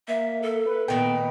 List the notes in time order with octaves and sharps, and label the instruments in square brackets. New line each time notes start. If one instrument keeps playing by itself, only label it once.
[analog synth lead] A#3 [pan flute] E5
[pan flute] A4
[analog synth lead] B4
[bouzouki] A#2 D#3 G5 [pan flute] B3